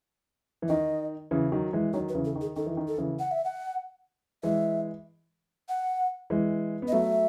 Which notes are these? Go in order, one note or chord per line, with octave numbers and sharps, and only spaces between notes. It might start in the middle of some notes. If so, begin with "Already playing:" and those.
E3
D#3 D#5
C#3 E3
D#3 F#3
E3 G#3
D#3 F#3 C#5
B4
C#3 E3
A4
D#3
G#4
D#3 A4
E3
D#3
A4
C#3 E3
F#5
E5
F#5
E3 G#3 E5
F#5
E3 G#3
B3
D#5
F#3 A3 E5